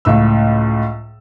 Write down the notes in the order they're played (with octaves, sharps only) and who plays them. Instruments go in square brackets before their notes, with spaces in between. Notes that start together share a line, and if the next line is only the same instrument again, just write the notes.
[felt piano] C#2 A2 E6